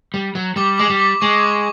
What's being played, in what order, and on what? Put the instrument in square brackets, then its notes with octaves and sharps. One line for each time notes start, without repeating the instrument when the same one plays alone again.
[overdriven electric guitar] G3
F#3
[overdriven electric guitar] G3 [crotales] D6
[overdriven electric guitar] G#3 [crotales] D6
[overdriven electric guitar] G3
[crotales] D6
[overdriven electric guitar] G#3 [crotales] C#6
[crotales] D6